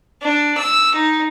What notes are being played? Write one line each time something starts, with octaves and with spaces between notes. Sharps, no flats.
D4
E6
D#4